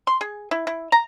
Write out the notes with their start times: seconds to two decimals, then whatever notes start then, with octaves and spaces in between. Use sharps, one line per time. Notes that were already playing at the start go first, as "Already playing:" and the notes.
0.07 C6
0.21 G#4
0.51 E4
0.67 E4
0.92 A#5